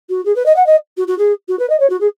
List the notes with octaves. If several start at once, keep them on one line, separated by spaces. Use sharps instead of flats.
F#4
G#4
B4
D#5
F#5
D#5
F#4
F#4
G#4
F#4
B4
D#5
C#5
F#4
G#4